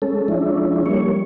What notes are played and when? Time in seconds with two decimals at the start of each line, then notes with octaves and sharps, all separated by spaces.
0.02 G#3 C#4 A4
0.28 F3 G#3 C#4 D4 E4
0.86 G3 A#3 C#5